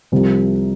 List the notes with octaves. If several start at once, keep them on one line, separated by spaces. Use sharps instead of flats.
C2 C3 F3